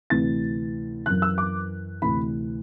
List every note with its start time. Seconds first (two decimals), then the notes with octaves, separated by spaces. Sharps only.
0.10 D2 C3 E3 A6
1.06 F#2 E3 F#6
1.22 E6
1.38 D6
2.02 D2 C3 E3 B5